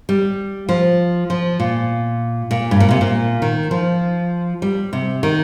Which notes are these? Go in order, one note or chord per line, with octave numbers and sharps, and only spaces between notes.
G3
F3
F3
A#2
A#2
G2
A#2
C3
A#2
D#3
F3
G3
C3
D#3